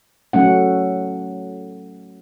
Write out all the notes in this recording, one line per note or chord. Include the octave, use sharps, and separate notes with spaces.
F#3 A3 C#4 F#5